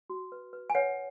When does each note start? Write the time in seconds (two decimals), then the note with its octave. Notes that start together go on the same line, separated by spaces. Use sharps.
0.10 F#4
0.32 B4
0.53 B4
0.70 G#5
0.75 B4 C#5 F#5